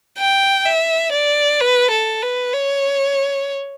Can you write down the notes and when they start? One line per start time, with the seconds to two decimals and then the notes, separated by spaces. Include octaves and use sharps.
0.18 G5
0.66 E5
1.12 D5
1.60 B4
1.91 A4
2.22 B4
2.54 C#5